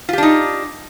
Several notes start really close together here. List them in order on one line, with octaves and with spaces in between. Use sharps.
F4 G4 D4 D#4